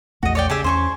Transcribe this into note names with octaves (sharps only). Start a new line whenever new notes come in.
A#1 E2 A3 F#4 D#5
C#5 D5 G5
C#3 G4 G#4 E5
E2 C#4 C5 G#5 C#6